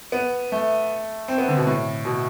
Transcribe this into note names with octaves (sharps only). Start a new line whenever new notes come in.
B3
A3
C4
B3
D3
B2
A2
B2